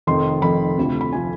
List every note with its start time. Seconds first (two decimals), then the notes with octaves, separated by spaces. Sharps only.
0.07 F1 F2 D#3 C6
0.42 F1 F2 D#3 B5
0.77 D2 C3 F3
1.01 B5
1.13 C3 F3 G#5